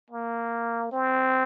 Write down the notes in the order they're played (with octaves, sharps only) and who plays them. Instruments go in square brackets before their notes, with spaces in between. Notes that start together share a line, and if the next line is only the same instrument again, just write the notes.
[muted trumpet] A#3
C4